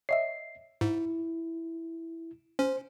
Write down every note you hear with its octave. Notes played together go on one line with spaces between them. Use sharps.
C#5 D#5 E5 C7
G#2 E4
C#4 C5